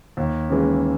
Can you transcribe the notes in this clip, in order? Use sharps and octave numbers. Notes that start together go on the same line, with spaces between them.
D#2
C#3 E3 G#3